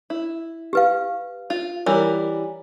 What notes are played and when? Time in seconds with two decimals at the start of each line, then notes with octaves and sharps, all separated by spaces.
0.10 E4
0.73 G4 B4 F5
1.50 F4
1.86 E3 G3 A#4 C#5